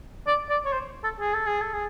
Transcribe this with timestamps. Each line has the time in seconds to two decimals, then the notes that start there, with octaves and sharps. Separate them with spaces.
0.27 D5
0.50 D5
0.65 C#5
0.73 C5
1.04 A4
1.20 G#4
1.34 A4
1.47 G#4
1.61 A4
1.74 G#4